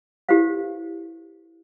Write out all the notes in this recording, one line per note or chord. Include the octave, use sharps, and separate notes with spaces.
E4 G4 A4 B4 C5 F5